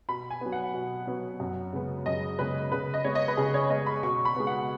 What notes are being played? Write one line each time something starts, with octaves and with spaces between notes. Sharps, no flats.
B2 B5
G#5
F#3 B3
F#5
B2
F#3 B3
F#2
C#3 G#3 B3
F#2 D#5
C#3 G#3 B3 B4
C#3 B4
D#5
G#3 B3 C#5
D#5
B4
C#3 G#4
C#5
G#3 B3 D#5
B5
B2 C#6
B5
G#3 B3
F#5